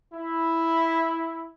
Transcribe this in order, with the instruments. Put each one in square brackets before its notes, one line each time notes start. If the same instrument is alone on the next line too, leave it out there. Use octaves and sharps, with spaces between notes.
[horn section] E4